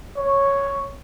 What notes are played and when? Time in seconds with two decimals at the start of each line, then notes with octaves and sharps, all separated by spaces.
0.17 C#5